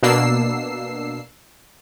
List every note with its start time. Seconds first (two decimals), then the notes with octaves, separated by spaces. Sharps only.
0.03 B2 A#3 D4 E6 C7